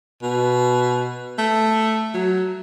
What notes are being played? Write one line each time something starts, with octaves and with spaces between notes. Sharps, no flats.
B2
A3
F#3